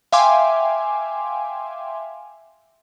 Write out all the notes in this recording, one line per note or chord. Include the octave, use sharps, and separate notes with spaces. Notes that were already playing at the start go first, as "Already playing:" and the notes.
E5 F5 G5 G#5 C6 D6